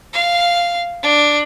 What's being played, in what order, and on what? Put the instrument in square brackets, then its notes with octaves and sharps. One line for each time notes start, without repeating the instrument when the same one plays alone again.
[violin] F5
D4